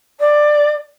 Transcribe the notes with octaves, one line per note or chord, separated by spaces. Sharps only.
D5